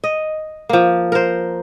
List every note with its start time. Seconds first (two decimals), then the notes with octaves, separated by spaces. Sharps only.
0.04 D#5
0.69 F3 A#3
1.12 A#4 C5